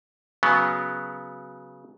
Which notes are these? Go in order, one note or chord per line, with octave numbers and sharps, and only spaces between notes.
C#3 F#3 B3